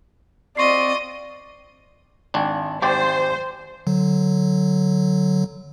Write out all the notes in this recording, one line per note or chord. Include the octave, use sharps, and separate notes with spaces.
C4 F4 D5 D#5 C6 C#6 C7
G#1 D4
G#1 G4 C5 D5
D3 F#3